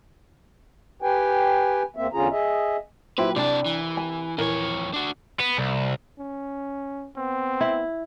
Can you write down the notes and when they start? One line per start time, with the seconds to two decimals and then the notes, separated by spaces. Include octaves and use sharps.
1.02 G4 B4 G5 G#5
1.97 E2 A#3 C4 E5
2.14 E2 D3 C#4 F4 G#4 A#5
2.31 G#4 D#5 E5
3.18 A#2 F#3 E4 G4 B4 C5
3.36 C2 C3 D4 D5 A5
3.66 E3
3.97 G#5
4.38 D#1 F2 E3 A#4 C#5
4.94 D4 F#4
5.40 B3
5.58 C2
6.19 C#4
7.17 B3 C4
7.61 E4